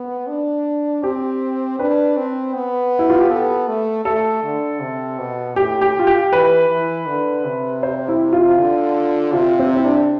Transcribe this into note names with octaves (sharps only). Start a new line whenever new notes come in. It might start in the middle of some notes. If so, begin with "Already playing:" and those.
Already playing: B3
D4
C4 G4
D4 B4
C4
B3
E4
F4
G4
B3 A4
A3
A3 A4
D3
C3
B2
A2 G4
G4
F4
G4
E3 B4
E3
D3
C3
C5
E4
F4
D3
C3 F4
C4
E4
D4